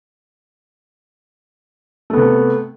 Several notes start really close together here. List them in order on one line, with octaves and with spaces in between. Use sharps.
A3 B3 C3